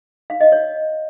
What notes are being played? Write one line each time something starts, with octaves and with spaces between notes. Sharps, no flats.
F5
D#5
C#5